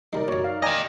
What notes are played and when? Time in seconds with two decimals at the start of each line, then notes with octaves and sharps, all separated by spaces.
0.13 G3 G#3 D#4 A#4 D5
0.28 F#2 B2 C#5
0.44 F5
0.62 G4 D5 D#5 G#5 A#5